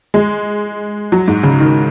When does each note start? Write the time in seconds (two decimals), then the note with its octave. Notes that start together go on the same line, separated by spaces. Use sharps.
0.14 G#3
1.12 F#3
1.28 G#2
1.43 C#3
1.60 D#3